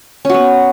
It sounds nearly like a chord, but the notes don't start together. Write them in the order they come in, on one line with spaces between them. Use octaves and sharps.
C#4 F#4 B3